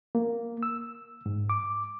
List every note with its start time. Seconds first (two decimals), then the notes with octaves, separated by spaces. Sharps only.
0.15 A#3
0.63 E6
1.26 G#2
1.50 D6